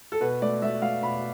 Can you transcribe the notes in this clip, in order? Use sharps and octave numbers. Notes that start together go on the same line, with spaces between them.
A4
B2 B4
A3 D5
A3 E5
A3 F5
B2 B5